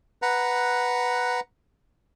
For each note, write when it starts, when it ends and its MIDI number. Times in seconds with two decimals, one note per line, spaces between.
0.22 1.40 71
0.22 1.40 78
0.22 1.40 82